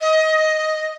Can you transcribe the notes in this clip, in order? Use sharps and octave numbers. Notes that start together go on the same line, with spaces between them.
D#5